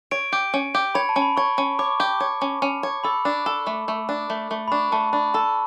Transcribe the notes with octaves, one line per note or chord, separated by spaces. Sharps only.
C#5 D7
G4 D7
C#4
G4
C#5 B5
A5
C#4
B5
C#5 C#6
C#4
C#5 D6
G4
C#5
C#4
C#4
C#5
A4 B5
D4
A4
A3
A3
D4
A3
A3
B5
D4 C#6
A3 A5
D4 B5
A4 A5